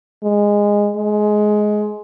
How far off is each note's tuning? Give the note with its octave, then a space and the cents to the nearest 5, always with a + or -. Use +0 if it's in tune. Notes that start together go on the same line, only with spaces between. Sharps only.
G#3 -15
G#3 +15